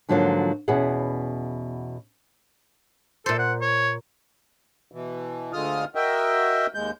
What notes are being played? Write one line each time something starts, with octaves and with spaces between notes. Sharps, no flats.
G#2 D3 F3 F#3 A#3 F4
E2 B2 C#4 E4 G#4 F#5
A#2 A4 C5
F#5
C#5
B2 E3
D2 D3 G#3 F4 D#6 F6
F#4 A#4 D#5 E5 G5
D#2 G#3 G6